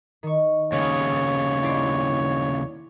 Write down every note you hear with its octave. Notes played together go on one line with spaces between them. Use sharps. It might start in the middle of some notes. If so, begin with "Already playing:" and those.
D#3 C#6
D#2 C#3 C#5
E4 D5 C6